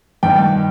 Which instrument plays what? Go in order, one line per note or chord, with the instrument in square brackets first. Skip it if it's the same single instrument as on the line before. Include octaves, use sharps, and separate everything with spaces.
[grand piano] G2 D#3 G5